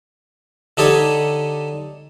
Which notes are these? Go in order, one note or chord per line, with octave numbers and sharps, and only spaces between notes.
D3 D#4 G4 A4 C#5